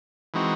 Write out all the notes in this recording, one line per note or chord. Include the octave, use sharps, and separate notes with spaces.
E3 G#3 C4 D#4 F#4